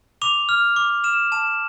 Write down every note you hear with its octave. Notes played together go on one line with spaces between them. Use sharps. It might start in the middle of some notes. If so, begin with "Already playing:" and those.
D6 F7
F6
D6
F6 E7
A5 E7